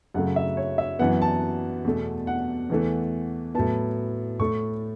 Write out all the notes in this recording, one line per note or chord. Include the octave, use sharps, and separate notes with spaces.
F#2 C#3 A3 F#5
E5
C#5
E5
F#2 E3 B3 F#5
A5
E2 B2 A3
F#5
E2 E3 A3
A2 F#3 B3 A5
A2 A3 C#6